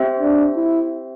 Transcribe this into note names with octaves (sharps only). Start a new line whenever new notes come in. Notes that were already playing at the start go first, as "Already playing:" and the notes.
Already playing: C4 G4 C5 E5 G5
D4
E4